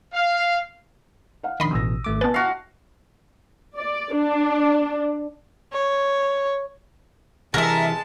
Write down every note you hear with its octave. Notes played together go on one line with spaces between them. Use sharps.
F5
F5 F#5
A#1 D#3 D#5 B5 C6
A1 B2 D#6 E6 A#6
G#1 A3 D6
B2 B4 G#5 A5 A6
F#4 F5
D5
D4
C#5
C3 E3 G#3 A#4 E5 A5